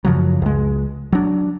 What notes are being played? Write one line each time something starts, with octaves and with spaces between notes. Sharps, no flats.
F#2 C#3 F3 F#3
C#2 G#3
F#3 D4